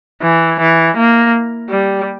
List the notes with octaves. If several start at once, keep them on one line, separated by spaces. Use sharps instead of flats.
E3
E3
A#3
G3